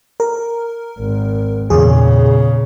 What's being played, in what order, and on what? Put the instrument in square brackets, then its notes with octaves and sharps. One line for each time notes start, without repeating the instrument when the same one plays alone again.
[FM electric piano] A#4
[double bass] G#1
[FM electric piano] E2 G#4 [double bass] A#2 C#3